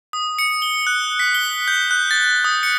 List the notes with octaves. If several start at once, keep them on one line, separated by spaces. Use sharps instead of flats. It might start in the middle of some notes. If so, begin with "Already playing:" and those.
D#6
C#7
G7
F#6
B6
G7
G6
F#6
A6
D#6
C#7